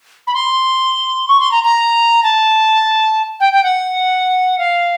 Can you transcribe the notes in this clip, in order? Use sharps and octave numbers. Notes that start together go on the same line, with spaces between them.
B5
C6
C#6
C6
A#5
A#5
A5
G5
G5
F#5
F5